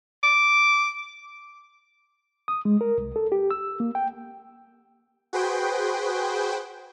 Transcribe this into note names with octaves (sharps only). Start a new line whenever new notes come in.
D6
D#6
G#3
A#4
C2
A4
G4
E6
A#3
G5
F#4 G#4 B4 C5 G5